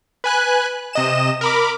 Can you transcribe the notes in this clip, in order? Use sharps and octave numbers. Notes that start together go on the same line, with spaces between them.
B4 G#5 F#6
C3 D#5 E7
A#4 B5 D6